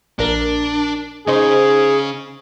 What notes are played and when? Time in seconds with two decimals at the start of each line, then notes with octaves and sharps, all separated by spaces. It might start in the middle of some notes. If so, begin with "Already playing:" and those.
0.19 A#1 D4 A#4
1.28 C#3 C#4 D#4 G#4 C5